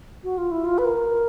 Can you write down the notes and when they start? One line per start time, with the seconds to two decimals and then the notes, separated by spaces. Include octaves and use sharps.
0.24 F#4
0.38 F4
0.51 E4
0.65 F4
0.78 B4
0.85 A#4